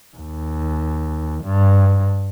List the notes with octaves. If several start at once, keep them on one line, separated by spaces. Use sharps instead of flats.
D#2
G2